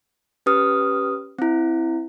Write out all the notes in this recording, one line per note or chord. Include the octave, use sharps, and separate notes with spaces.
C#4 G4 B4 D#6 F6
C4 E4